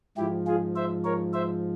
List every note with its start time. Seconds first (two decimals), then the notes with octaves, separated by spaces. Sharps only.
0.17 G#2 F3 E4 G4
0.47 F4 G#4
0.76 C5 E5
1.04 A#4 C#5
1.33 C5 E5